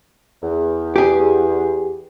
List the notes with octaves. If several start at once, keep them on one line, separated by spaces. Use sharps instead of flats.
E2
G4 G#4